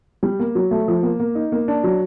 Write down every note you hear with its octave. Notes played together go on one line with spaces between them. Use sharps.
G3
A#3
F#3
A3
F3
A#3
A#3
D#4
A#3
D4
F#3